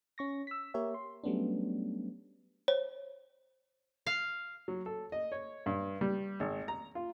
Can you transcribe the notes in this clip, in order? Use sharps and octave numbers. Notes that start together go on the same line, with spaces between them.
C#4 C#6 A#6
E6 B6
A#3 G4 A#4 C#5 E5
C6
F#3 G3 A3 B3 C#4 D4
C5 C#5
F5
F#3
A4
D#5
C#5
G2
G3
G#1
A#5
F4